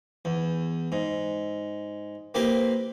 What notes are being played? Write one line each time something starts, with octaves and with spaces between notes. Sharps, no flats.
E2
G#2
A#3 C4 E4 G4 A#4 B4